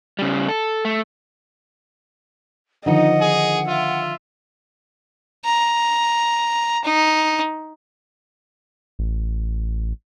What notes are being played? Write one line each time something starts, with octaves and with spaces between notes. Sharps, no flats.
C#3 G3
A4
A3
D3 D#3 F3 D#4 D#5 F#5
G#4
F4 E5
A#5
D#4
A1